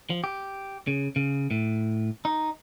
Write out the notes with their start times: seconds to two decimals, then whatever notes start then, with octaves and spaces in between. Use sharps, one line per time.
0.10 F3
0.24 G4
0.87 C#3
1.16 C#3
1.51 A2
2.25 D#4